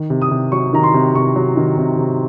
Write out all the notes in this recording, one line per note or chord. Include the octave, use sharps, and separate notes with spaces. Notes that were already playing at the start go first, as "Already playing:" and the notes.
Already playing: D#3
C3
D#6
C3
F#3 C#6
D#3 A#5
C6
C3
C3 C#6
F#3
D#3
C3
C3